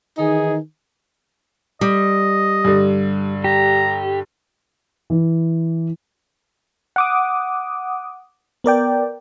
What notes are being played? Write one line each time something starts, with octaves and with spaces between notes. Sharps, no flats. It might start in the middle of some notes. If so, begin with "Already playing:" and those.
D#3 E3 D#4 G#4
G3 D#5
G2 D3
G4 A#5
E3
F#5 D6 D#6
B3 A#4 D5 G5